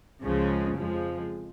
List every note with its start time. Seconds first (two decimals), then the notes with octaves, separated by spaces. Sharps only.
0.24 C#2 C#3 F3 G#3
0.77 F2 F3 G#3